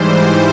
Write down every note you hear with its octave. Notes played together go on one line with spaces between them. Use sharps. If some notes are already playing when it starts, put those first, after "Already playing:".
Already playing: G#2 E3 G3 C5